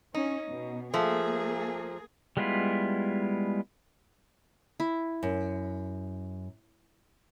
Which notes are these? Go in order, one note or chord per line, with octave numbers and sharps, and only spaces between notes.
C#4 D#4
B2
F3 A3 A#3 G#4
G3 G#3 B3 E4 F4
E4
F#2